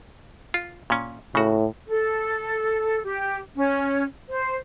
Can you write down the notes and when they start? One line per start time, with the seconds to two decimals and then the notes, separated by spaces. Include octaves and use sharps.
0.54 F4
0.90 A#2 C#4
1.35 A2 C#3 F#4
1.89 A4
3.04 G4
3.56 C#4
4.29 C5